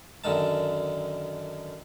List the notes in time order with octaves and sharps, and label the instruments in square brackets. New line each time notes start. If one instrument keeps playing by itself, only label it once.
[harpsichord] F#2 D3 D#3 A5